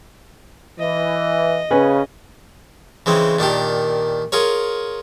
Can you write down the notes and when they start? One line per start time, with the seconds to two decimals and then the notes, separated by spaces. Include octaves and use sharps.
0.79 E3 D#5
1.71 C#3 C#4 B4 G#5
3.06 C#3 E3 G#3 C4
3.39 A#2 D#3 D4 G4
4.32 F4 G#4 A#4 C#5